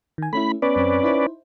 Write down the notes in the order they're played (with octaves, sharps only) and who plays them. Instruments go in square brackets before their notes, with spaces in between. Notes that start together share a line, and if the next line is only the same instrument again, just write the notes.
[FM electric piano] D#3 G#5
[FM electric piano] A3 C#4 E4 [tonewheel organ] B5
[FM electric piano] B3 [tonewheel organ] C#4 B4 D5
[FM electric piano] F#2 C4
D#4 E4 C5